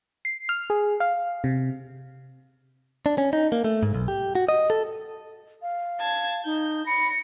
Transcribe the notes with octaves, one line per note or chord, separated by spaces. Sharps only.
C7
F6
G#4
F5
C3
D4
C#4
D#4
A#3
A3
G#2
B1
G4
F#4
D#5
A4
F5
A5 G#6
D#4 G6
B5 A#6 C#7